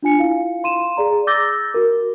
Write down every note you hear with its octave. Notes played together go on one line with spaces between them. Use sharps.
D4 F4 G#5 C#7
E4 F4 F5
F5 C6 D#7 E7
G#4 D5 A#5
D6 E6 G6 A6 A#6 G7
F#4 A#4